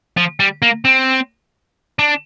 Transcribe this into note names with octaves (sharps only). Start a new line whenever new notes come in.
F3
G3
A#3
C4
D4